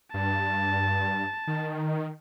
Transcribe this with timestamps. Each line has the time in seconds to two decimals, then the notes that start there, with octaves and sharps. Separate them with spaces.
0.14 G2 A5
1.47 D#3